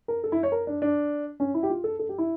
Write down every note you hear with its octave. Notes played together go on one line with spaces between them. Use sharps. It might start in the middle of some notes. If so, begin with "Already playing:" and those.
A#4
A4
E4
C#5
A#4
D4
D4
C#4
E4
G4
F4
A4
A4
G4
E4